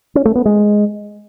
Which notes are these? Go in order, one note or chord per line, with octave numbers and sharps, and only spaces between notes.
C#4
A3
B3
G#3